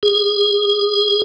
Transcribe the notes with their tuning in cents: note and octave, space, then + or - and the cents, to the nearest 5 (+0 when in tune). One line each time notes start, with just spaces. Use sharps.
G#4 -20